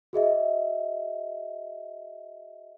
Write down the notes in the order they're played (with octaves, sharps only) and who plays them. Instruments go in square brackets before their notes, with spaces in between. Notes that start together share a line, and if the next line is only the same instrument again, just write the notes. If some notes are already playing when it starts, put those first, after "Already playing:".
[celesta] F#4 G#4 D#5 E5